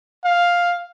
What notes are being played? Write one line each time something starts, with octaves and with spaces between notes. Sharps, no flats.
F5